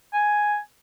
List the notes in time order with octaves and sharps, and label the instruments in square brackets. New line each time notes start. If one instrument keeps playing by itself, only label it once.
[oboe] G#5